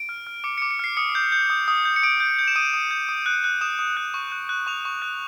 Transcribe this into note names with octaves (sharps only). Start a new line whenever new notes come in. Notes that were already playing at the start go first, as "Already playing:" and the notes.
Already playing: D7
F6
F6
D6 C#7
C#7
D6
C#7
F6 C7
D#6 C#7
G6
G6
D#6
D#6
G6
C#7
D#6 D7
G6
G6
E7
D#6 D#7
D#6
G6
D#6
F#6
F#6
D#6 E7
D#6
F#6
C#6
F#6
F#6
C#6 F7
C#6
F#6